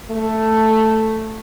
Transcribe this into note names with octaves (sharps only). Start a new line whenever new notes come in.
A3